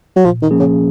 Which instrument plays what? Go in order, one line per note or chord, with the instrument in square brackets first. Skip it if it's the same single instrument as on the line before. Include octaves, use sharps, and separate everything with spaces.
[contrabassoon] F#3
[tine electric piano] A#2 [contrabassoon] F3
[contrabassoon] D#3
[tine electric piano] F3 A#3 C#4 G#4
[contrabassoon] C#3